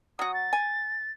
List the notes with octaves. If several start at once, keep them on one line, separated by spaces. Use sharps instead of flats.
F#3 F#4 D#6
A6
G#5